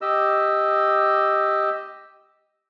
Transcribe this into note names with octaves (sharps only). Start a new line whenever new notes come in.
G4 D#5 E6